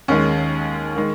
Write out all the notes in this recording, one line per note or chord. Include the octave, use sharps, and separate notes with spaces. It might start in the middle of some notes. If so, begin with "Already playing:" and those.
D#2 D#3 G#3 C#4
D#3 G#3